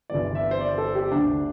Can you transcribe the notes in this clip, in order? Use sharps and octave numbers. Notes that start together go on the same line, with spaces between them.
G1 G2 E3 D5
E5
C5
D5
A4
G4
D2 D3 D4